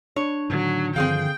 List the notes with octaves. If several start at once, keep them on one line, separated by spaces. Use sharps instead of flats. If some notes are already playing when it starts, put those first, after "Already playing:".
D4 C#5
A2 D3 D#3 F#3
G2 D3 D#3 F3 C4 G#4 F5 G5